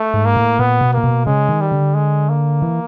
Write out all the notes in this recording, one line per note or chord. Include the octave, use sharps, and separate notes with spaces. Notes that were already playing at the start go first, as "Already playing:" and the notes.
Already playing: A3
G#2
A#3
A2
A#2 B3
B2
A#2 A#3
B2
C#3 G#3
D#3
G3
D3
G#3
A#3
E3